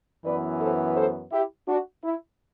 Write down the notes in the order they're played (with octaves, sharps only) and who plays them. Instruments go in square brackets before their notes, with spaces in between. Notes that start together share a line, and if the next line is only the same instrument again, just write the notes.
[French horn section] F#2 E3 B3 B4 D5
A4 C5
A4 C5
E4 G4
D4 F#4
E4